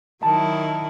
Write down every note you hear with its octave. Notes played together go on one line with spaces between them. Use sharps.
D#3 F#3 E4 A5